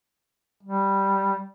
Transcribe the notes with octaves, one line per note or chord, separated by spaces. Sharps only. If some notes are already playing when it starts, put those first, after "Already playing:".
G3